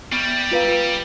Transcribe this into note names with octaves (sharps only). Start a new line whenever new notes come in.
G3 B3
F4 B4 F5